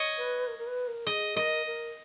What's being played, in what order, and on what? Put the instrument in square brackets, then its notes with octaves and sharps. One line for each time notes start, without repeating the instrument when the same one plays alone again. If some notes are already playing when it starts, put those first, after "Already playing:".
Already playing: [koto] C#5 D#5
[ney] B4
A#4
A#4
B4
A#4
[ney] G#4 [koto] D#5
[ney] A#4 [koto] D#5
[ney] A#4